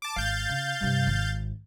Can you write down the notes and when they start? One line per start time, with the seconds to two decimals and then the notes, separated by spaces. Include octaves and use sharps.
0.02 A5 D6
0.16 G#1 F5 G6 A6
0.49 C#3
0.81 G2 C3
1.07 G#1